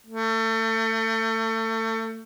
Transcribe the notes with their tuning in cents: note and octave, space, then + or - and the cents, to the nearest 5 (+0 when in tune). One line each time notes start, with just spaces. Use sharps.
A3 +30